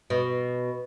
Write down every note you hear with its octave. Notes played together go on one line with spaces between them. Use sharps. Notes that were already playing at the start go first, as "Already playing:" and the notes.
B2